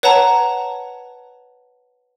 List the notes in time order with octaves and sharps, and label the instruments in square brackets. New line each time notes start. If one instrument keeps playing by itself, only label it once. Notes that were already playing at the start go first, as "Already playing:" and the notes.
[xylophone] B4 C#5 F#5 A5 A#5